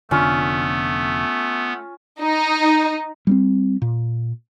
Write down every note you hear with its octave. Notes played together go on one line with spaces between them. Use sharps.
F1 D3 A3 B3 C#4 F4
D#4
G3 A#3 C4
A#2